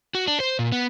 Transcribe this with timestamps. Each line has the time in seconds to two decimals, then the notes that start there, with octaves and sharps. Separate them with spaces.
0.15 F#4
0.28 D4
0.40 C5
0.59 A#2
0.72 B3